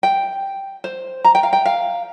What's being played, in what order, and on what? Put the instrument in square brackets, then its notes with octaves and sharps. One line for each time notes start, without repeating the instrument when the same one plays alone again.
[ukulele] G5
C5
A#5
G5
F5
G5
F5